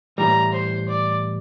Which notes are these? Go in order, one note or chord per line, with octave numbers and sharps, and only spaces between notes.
A2 E3 G3 A#5
C5
D5